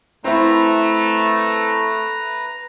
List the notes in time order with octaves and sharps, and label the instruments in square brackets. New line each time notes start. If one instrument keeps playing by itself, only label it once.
[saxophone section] A3 [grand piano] C4 E4 [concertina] B4 A#5